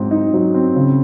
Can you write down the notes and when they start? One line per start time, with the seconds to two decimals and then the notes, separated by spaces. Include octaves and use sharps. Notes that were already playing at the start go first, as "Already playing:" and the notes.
Already playing: G#2 F#3 C4
0.11 D#4
0.33 F#3
0.54 C4
0.76 C#3